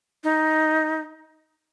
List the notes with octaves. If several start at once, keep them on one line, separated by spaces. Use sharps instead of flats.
D#4